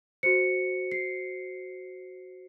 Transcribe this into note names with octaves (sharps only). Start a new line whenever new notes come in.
F#4 C5 C#7
C7